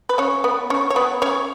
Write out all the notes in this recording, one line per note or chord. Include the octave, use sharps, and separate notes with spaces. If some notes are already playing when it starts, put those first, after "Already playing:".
B4
C#4 C#5
B3 B4
C#4 C#5
C#5
B3 B4
C#4 C#5